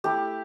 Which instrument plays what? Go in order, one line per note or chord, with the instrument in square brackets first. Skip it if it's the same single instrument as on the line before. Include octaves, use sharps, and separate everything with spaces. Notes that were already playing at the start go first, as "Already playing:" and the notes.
[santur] A3 E4 G4